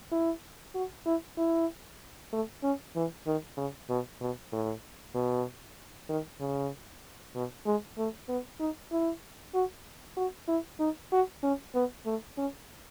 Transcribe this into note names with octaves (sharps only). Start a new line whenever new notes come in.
E4
F#4
E4
E4
A3
C#4
E3
D#3
C#3
B2
B2
A2
B2
D#3
C#3
B2
G#3
A3
B3
D#4
E4
F#4
F#4
E4
D#4
F#4
C#4
B3
A3
C#4